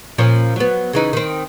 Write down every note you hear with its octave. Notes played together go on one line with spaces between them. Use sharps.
A#2 F3 C#4
F#3 B3
C#3 E3 D#4
D#3 C4